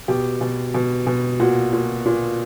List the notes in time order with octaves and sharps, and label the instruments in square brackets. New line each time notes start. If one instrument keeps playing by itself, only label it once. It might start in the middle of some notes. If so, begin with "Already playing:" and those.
[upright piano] B2 G4
B2
B2
B2
A#2 F#4
A#2
A#2